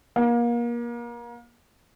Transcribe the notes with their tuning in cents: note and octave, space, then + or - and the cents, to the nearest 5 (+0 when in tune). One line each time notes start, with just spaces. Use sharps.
A#3 +30